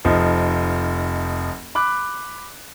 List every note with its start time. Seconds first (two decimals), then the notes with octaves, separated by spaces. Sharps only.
0.05 F1 F3 D#4
1.75 B5 D6 F#6